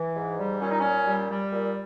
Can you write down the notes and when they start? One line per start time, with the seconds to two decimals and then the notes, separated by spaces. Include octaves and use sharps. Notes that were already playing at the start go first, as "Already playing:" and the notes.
Already playing: E3
0.16 G#2
0.38 G3
0.60 A#2 C#4
0.70 D#4
0.79 A#2 C#4
1.06 G3
1.29 G3
1.52 A#2